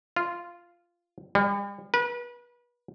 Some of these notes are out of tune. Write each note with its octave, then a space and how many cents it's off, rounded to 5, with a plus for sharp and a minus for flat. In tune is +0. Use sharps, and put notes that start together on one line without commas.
F4 -10
G3 +40
B4 -35